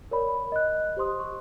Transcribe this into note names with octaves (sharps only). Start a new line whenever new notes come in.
A#4 C#5 D5 B5
D#5 F#6
G4 C5 D#5 C6 D#6
C6 C#6